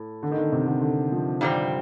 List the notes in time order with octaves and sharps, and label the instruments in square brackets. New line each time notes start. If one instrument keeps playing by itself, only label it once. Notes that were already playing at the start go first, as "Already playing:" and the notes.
Already playing: [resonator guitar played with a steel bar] A2
[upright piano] D3
D#3
D3
C3
D3
D3
F3
[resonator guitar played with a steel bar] G2 D#3 G3 C4